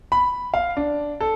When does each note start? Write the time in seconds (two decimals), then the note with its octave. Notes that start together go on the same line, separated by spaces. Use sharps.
0.12 B5
0.54 F5
0.77 D4
1.20 A4